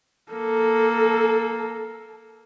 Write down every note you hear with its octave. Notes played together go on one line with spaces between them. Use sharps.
A#3 A4